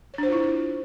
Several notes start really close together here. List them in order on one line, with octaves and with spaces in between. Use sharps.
C#5 D4 C5 F4 E4